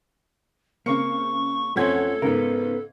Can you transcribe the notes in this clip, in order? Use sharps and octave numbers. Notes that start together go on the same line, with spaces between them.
C#3 A#3 C4 C#6 C#7
F2 A3 C#4 A4 C5 F#5 G#6
G#2 C#3 B3 A#4